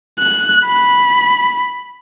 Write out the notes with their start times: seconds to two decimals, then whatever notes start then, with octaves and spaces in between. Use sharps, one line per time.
0.19 F#6
0.65 B5